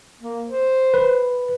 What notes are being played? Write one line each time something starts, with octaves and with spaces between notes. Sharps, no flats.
A#3
C5
B4